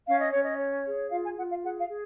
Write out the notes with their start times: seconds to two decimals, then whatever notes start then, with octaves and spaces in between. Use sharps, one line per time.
0.07 C#4 F5
0.20 D#5
0.32 C#4 C#5
0.44 D#5
0.59 C#5
0.85 G#4
1.11 F4 F5
1.24 G#5
1.37 F4 F#5
1.50 F5
1.63 G#4 F#5
1.79 F5
1.88 G#4